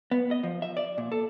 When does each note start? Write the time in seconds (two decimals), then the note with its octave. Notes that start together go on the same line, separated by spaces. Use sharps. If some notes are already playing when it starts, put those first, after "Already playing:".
0.11 B3
0.31 D#5
0.43 F3
0.62 E5
0.77 D5
0.98 A#2
1.12 A4